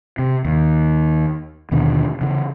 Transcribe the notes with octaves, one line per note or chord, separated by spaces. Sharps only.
C3
D#2
D#2 B2 D3
C#3 E3